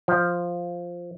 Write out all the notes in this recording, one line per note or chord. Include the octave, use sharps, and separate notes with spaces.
F3